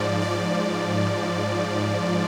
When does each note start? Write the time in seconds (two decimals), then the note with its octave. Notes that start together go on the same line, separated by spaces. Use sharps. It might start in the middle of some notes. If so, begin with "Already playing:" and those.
Already playing: G#2 F3 D5
0.21 D5